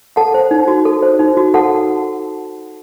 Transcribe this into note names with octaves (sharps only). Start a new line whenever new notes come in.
A4 F#5 A5
C5
D#4
F#4
A4
C5
D#4
F#4
A4 F#5 A5